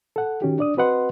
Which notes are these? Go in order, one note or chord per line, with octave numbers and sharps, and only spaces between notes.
A4 F#5
D#3 C#4 F#4 G4
D4 D5 D#6
C4 F#4 B4 D#5 F#5 C6